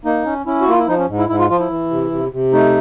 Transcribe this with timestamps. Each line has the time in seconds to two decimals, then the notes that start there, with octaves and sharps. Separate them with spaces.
0.05 A#3 D#4
0.25 C#4
0.46 C#4 E4
0.61 F#4
0.67 A#3 F4
0.79 E4
0.88 F3 D#4
0.98 C#4
1.08 G#2
1.18 E4
1.29 G#2 E4
1.39 F4
1.50 F3 F4
1.60 E4
1.70 E3
1.91 C3
2.11 C3
2.32 C3
2.53 A3 D#4